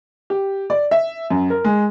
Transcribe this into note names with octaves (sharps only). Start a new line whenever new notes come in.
G4
D5
E5
F#2
A#4
G#3